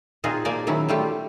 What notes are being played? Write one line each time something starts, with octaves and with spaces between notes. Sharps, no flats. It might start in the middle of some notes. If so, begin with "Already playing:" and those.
A#2 C4 D#4 F4 F#4 G#4
F3 A#3 G#4 D5 G#5
D#3 F#3 C#4 E4
G3 A3 F4 G4